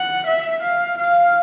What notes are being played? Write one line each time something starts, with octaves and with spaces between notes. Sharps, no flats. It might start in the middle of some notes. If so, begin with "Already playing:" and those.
Already playing: F#5
E5
F5
F5